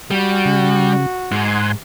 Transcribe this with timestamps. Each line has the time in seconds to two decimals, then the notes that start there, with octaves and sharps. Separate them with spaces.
0.11 G3 F#4
0.45 C#3
1.31 G#2 F#5 G#5 C6